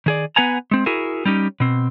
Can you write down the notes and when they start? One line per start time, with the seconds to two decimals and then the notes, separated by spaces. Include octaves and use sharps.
0.06 D#3 G#4 D5
0.36 B3 B4 F#5 G#5 A#5
0.71 G#3 C4
0.86 E4 F#4 G#4 A#4
1.25 G3 C#4 D#4 G4
1.60 B2 C4